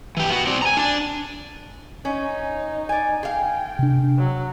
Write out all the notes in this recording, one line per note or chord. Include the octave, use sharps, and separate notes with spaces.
E3 G4
B3 F#4
C4 D5
G#5 A#5
D4 D5
C#4 D#4
D5 G#5
G#4 F5 G5
C3 D4
F#3